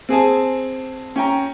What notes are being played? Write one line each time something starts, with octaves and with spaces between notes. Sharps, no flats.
C4 G#4 G#5 A5
C#4 G5 A#5